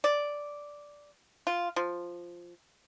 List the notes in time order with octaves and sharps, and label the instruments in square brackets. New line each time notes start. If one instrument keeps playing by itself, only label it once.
[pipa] D5
F4
F3